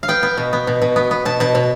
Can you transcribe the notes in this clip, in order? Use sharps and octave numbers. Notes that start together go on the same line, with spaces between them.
F5
B3 G5
B3
B2
B3
B2
B2
B3
B3
B2 A5
B2 A5
B2